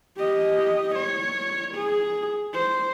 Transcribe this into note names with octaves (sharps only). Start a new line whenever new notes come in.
G4 D#5
C#5
G#4
C5